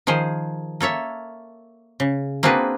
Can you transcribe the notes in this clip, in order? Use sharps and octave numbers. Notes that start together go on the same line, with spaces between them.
D#3 F3 G#4 C5
A#3 A4 C#5 E5
C#3
A#3 C4 D4 F#4 G#4 B4